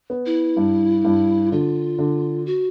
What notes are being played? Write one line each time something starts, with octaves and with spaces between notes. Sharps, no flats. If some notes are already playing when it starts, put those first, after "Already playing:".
B3
E4
G2
G2
D3 F4
D3
F#4